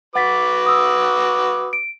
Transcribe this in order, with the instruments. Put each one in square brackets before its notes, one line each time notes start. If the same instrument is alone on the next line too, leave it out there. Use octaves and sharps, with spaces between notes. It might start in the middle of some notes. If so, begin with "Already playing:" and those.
[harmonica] F#4 B4 D6 [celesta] F#5 A6 B6
[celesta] D#6 E6
D7